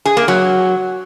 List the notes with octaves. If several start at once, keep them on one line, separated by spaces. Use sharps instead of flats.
G#4
A#3
F#3